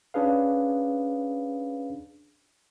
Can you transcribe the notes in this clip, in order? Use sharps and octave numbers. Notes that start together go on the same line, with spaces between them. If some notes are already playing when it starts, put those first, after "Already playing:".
C#4 D4 G#4 B4 F5